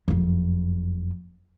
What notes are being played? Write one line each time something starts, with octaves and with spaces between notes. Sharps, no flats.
F#1 F2